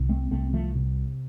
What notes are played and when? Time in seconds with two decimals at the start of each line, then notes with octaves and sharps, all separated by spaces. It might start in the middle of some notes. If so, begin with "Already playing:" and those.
Already playing: C2
0.09 A3 C4
0.31 C2 A3 C4
0.53 F3 A3
0.75 C3